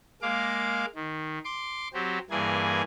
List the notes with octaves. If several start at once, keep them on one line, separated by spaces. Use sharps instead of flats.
G#3 A#3 F5 D6
D#3
C6 D6
F#3 C4 G4
G2 E3 A#3 G#4 G#5